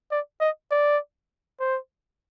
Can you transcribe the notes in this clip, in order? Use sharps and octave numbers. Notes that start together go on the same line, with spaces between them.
D5
D#5
D5
C5